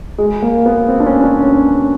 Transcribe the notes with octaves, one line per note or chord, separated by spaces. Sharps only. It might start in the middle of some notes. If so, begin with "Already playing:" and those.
G#3
A#3
B3
C4
D4
C#4
D4
C#4